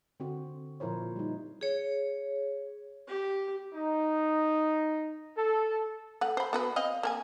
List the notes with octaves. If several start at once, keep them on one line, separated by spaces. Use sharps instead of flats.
D3 C4 F#4
A#2 F3 E4 A#4 C5 C#5
G3 D#4
G#4 C#5
G4
D#4
A4
A3 F#5
C5 B5
B3 F#4 B4
C4 D#5 F5
A#3 A#4 G#5